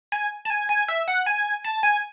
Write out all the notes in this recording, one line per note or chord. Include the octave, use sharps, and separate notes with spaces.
G#5
A5
G#5
G#5
E5
F#5
G#5
A5
G#5